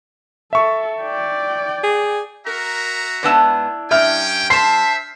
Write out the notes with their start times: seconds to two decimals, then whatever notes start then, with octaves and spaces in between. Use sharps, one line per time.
0.53 A4 E5 C#6
1.02 D5 G5
1.83 G#4
2.47 F#4 A#4 E5 A#5
3.23 G#2 B3 D4 E4 A5
3.91 G2 C#4 E5 G5 F6
4.50 C5 E5 A5 C6 C7